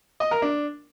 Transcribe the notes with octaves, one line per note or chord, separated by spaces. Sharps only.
D#5
A#4
D4